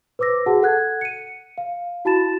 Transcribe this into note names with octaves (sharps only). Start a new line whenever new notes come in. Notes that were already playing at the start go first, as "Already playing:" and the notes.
B4 C5 D6 E6 A#6
F#4 G#4 F#5 A5
A4 F#5 F#6 G#6
C#7 D#7
F5
E4 F#4 A5 B5 A6 E7